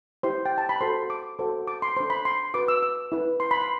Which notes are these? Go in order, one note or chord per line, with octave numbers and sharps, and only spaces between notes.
E4 G4 C5 C6
G5
A5
B5
F#4 A4 C5 C6
D6
F#4 A4 C5
D6
C6
D4 A4 C5 C6
B5
C6
F#4 B4 D6
E6
E6
E4 B4
C6
B5
C6